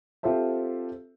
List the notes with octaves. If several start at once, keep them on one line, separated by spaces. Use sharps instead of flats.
C4 F4 G4 A4 C5 E5